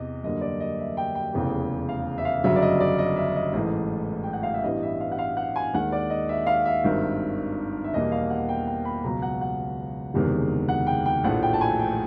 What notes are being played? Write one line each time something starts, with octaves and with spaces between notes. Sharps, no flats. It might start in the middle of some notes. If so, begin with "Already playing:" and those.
Already playing: E2 C3 D#5
F#2 D3 G3 A#3 D#5
D5
D#5
E5
G5
G5
F1 E2 C#3 E3
F5
E5
F5
G1 F#2 C#3 F#3 E5
D5
D#5
D5
D#5
E5
D#5
A1 G#2 E3 A3 D#5
G5
F#5
F5
E5
A1 G2 E3 G3 B3 D#5
E5
F5
F#5
F5
F#5
G#5
D#2 D#3 G#3 F#5
D5
D#5
E5
F5
E5
G#1 G2 D#3
E5
E2 B2 G3 A#3 D#5
F5
F#5
G5
G5
B5
C#2 B2 F#3 A#5
F#5
F#5
F#1 E2 C3 D#3 G#3
F#5
G5
G5
A#1 A2 F3 A3 F#5
G5
A5
G#5
G5